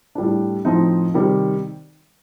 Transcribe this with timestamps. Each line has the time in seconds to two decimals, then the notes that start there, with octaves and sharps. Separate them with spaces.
0.15 A2 G3 D4
0.65 A2 F3 C4 D#4
1.14 C3 D#3 G3